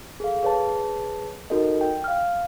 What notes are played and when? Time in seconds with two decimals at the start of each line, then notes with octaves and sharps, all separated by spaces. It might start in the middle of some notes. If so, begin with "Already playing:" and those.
0.20 G#4 A4 F5
0.43 G#4 B4 C#5 A5
1.50 D#4 F#4 A4 A#4 D#5
1.81 G5
2.04 F5 F6